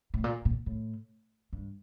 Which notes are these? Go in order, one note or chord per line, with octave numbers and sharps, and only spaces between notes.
A2
A#2
A#2
A2
G2